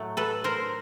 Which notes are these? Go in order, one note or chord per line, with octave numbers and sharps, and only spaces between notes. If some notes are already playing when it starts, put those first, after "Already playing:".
Already playing: A2 F#3 A3
A4 B4
A#4 C5